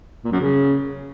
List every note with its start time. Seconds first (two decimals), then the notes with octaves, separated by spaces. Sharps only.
0.25 A#2
0.32 F#2
0.40 C#3